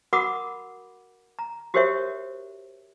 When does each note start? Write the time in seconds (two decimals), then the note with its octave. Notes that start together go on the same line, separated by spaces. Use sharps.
0.13 F#4 A#4 F#5 B5 D6 D#6
1.39 A#5
1.74 F#4 G4 A#4 C5 C#5 E5